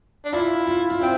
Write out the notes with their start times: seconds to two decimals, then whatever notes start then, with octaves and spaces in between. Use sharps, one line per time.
0.25 D4
0.33 E4 F4
0.67 F4
0.90 F4
1.01 C4 E4